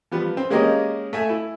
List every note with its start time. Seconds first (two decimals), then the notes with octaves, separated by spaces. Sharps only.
0.11 F3 G3 B3
0.37 C4
0.50 G#3 A#3 C#4 G4 D#5
1.13 A3 E5 G#5
1.29 E4